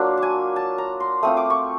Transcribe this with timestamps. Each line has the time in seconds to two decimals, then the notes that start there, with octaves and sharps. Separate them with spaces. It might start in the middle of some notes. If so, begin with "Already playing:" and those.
Already playing: F#3 A#3 D4 F4
0.17 A5
0.22 G#5
0.56 A5
0.78 A#5
1.00 C6
1.23 A3 C4 F4 D#6
1.37 D6
1.50 C#6